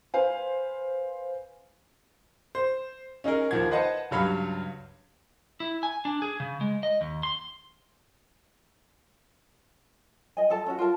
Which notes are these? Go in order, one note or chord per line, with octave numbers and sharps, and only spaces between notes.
B4 C5 F5 G#5
C5
C#4 D#4 G#4 A#4
D#2 D#3 F3 F#5 G#6
B4 C5 D#5 F#5 A5
C#2 G2 F#3 F5 B5 F6
E4
G#5
D4
G#4
C#3
G#3
D#5
D#2
C6
D#5 G#5
A4 A5
C#4 F#4
F4 A#4 A5